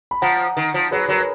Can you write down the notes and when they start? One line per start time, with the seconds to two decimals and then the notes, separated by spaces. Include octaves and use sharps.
0.11 B5
0.22 F3 F#5 A#5
0.57 D#3
0.74 F3
0.91 F#3 G#4 B4
1.09 F#3 A#4
1.18 B4